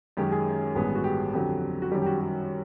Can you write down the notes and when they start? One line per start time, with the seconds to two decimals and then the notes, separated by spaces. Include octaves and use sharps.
0.17 F#2 D#3 G#3 C#4 G4
0.32 G#4
0.75 A1 G2 D#3 G#3 B3
0.95 F#4
1.04 G4
1.33 F2 D3 F#3 G4
1.82 F#4
1.92 F#2 D#3 G3 G4
2.02 G4
2.06 F#4
2.21 G4